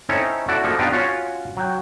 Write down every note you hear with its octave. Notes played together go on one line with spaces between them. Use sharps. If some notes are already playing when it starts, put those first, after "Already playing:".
C4 C#4 D#4 E4 A4 C#5
E4 F#4 A4 D5 F#5
F3 A#3 D#4 A4
B3 D4 D#4 F4 G4
C#4 F4 F#4 C#5
F#3 G5